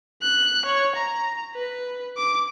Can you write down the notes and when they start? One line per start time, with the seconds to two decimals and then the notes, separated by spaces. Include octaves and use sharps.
0.22 F#6
0.65 C#5
0.96 A#5
1.55 B4
2.17 D6